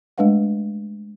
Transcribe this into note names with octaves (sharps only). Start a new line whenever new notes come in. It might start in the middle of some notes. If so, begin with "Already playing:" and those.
G#3 A3 D4 B4 F5 F#5